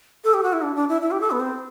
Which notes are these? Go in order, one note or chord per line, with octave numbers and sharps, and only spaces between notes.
A4
G4
F#4
E4
D4
D4
E4
E4
G4
A4
B3
C4